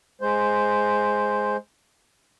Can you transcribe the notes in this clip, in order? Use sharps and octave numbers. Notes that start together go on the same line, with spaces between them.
G#3 C5